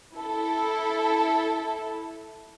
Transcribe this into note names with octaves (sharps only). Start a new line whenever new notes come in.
E4 A4